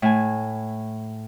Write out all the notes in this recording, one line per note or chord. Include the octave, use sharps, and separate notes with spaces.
A2 G#5